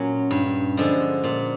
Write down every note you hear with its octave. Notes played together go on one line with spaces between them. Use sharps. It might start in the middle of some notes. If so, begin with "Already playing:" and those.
Already playing: A#2 F#3 C#4
G2
D3 F3 G#3
A#2